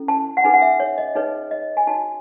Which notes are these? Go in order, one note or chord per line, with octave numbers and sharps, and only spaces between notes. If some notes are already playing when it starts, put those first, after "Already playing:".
Already playing: C#4 E4 A4
A5
F#5
D#4 G#4 B4 G#5
F#5
E5
C#5
D#5
D#4 G#4 B4 C#5
D#5
G#5
D#4 F#4 C#5 A5